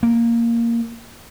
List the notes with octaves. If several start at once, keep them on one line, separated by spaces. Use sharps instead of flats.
A#3